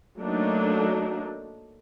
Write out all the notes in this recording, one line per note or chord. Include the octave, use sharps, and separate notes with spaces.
F#3 A3 A#3 D4 D#4